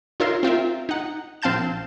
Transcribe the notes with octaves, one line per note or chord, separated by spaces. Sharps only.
D#4 F4 A#4 C#5 E5 C6
C4 F4 A#4 E5
D#4 F#5
A#1 C4 F5 A5 G6 E7